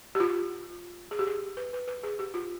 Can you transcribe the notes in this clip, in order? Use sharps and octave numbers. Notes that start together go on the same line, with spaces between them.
G4
F4
G#4
G4
G#4
B4
B4
B4
G#4
G4
F4